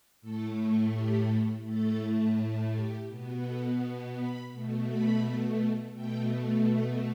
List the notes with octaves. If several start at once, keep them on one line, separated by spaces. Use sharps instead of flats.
A2 A3 A4
G4
A2 A3 A4
G4
B2 B3
A4
B5
B2 A3
B5
B2 A3 G5
E5